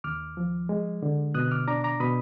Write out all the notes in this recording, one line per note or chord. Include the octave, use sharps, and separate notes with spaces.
D#2 D6 F6
F3
G#3
D3
B2 D#6 F#6
D6 F6
D4 A#5 D6
A#5 D6
B2 B5 D#6